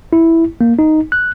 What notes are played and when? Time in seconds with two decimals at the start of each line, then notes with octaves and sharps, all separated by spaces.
0.13 E4
0.61 A#3
0.79 D#4
1.12 F#6